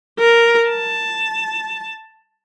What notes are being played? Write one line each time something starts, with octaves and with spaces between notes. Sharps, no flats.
A#4
A5